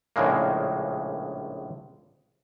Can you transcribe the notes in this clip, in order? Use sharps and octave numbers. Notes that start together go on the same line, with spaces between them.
A#1 A2 C#3 G#3 A#3